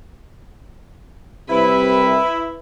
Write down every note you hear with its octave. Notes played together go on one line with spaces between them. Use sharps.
C2 C3 E4 B4